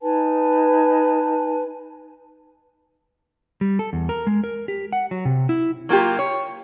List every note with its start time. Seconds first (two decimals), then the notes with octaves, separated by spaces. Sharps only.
0.03 D#4 B4 G#5 A5
3.61 G3
3.79 A4
3.93 E2
4.09 A#4
4.27 G#3
4.44 A#4
4.68 G4
4.92 F#5
5.11 F#3
5.25 C3
5.49 E4
5.89 F#3 A#3 F4 G4
6.19 C#5